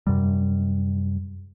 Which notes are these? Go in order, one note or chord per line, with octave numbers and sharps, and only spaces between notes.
F#2 C3 G3